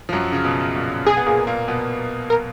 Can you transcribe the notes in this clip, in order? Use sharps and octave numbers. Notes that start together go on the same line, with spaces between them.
F3
F#2 F#3
C#3
B2
A#2
B2 G#4
B3
A#2 A#3
A#2 A#3
B2 B3
A#4